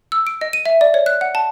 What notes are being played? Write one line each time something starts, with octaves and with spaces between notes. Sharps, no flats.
E6
D7
D#5
D#7
E5
D5
C#5
F#6
F#5
A5